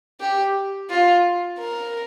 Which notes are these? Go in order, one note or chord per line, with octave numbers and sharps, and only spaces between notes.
G4
F4
A#4